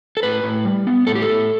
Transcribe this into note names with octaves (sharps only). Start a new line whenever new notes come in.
A4
A2 B4
A2
G3
B3
A2 A4
G4
A4
A2